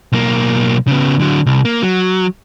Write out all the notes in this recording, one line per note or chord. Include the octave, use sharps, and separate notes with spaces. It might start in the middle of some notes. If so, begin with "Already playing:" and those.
B1 A#3
C#3 B3
D3 F#3
C2
A#3
F#3